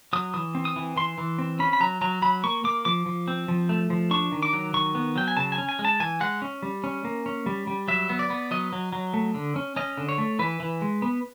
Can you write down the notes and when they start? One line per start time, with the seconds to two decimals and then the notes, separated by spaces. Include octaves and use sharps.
0.13 F#3 D#6
0.34 E3 D#6
0.55 C4
0.65 D#6
0.76 E3
0.96 E3 C6
1.18 E3
1.39 C4
1.59 C#4 B5
1.73 B5
1.80 F#3 A#5
2.01 F#3 A#5
2.22 F#3 B5
2.44 A#3 C#6
2.64 A#3 D6
2.85 F3 D6
3.06 F3
3.28 C4
3.48 F3
3.69 A3
3.90 F3
4.11 D4 C#6
4.32 D#3
4.43 D6
4.53 F#3
4.74 D#3 C#6
4.95 B3
5.16 F#3 G5
5.28 G#5
5.37 C#3 A5
5.52 G#5
5.58 C#4
5.69 G#5
5.79 G#3
5.85 A5
6.00 E3 G#5
6.21 G#3 F#5
6.42 C#4
6.63 G3
6.84 C#4
7.05 A#3
7.26 C#4
7.46 G3
7.67 G3
7.88 F#3 E5
8.09 B3
8.19 D5
8.30 B3
8.51 F#3 D#5
8.73 F#3
8.93 F#3
9.14 A3
9.34 D3
9.56 C#4
9.76 C#4 D#5
9.98 D3
10.09 C#5
10.18 A3
10.39 E3 B4
10.60 E3
10.82 G#3
11.02 B3